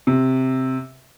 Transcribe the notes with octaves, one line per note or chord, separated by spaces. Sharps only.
C3